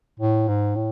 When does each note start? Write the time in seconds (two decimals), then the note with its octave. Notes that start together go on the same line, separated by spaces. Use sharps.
0.20 A2
0.48 G#2
0.75 A2